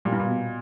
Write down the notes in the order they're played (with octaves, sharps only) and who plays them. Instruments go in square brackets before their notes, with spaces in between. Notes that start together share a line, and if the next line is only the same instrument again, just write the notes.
[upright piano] A#2 [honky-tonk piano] G3
[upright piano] G2
A#2
[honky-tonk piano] B2